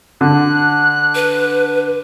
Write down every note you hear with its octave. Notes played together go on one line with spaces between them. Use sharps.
D3 F#6
B4